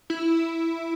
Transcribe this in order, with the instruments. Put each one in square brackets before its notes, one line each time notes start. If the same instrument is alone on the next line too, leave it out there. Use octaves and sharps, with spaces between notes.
[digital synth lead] E4